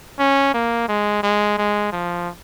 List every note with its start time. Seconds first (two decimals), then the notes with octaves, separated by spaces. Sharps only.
0.19 C#4
0.54 A#3
0.89 G#3
1.23 G#3
1.58 G#3
1.93 F3